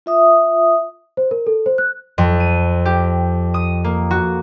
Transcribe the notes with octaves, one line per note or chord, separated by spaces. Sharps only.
F4 E5 D#6
C5
A#4
A4
C5
F#6
F2
D#7
G4
D#6
A#3
F#4